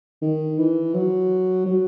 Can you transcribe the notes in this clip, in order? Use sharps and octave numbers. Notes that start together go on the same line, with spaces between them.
D#3
E3
F#3
F#3